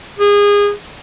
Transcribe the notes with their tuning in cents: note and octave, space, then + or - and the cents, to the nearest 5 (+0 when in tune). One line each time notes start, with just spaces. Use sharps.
G#4 -25